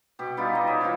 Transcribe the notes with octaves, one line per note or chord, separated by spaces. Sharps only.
B2 G4
G3 B3 D#4 F4
D#4 D#5
C#5 E5
E3 F4 C5 F5